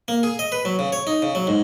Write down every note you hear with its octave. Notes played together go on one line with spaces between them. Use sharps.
A#3
G#4
D#5
B4
F#3
C#3
C#5
D#4
C#3
F#3
G#2